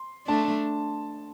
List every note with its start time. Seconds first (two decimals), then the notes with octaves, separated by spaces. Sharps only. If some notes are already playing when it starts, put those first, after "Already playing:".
Already playing: C6
0.27 A3 D4 A5